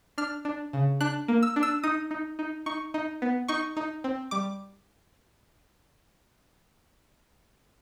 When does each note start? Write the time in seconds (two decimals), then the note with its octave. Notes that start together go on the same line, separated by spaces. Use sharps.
0.18 D4 F6
0.45 D4
0.73 C#3
1.01 D4 F#6
1.28 A#3
1.43 E6
1.56 D4
1.63 E6
1.83 D#4 D#6
2.11 D#4
2.39 D#4
2.66 D#4 C#6
2.94 D#4
3.22 B3
3.48 D#4 C#6
3.77 D#4
4.04 C4
4.31 G3 D6